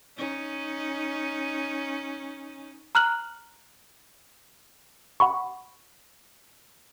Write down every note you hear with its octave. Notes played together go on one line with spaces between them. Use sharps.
C#4 D#4
A#5 F6 F#6 F#7
F#5 B5 C#6